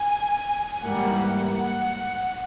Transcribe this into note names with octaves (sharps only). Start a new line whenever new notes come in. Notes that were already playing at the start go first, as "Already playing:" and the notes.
Already playing: G#5
G#2 E3 G3 A#3 F#5
F#5